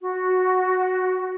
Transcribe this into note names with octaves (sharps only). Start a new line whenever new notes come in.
F#4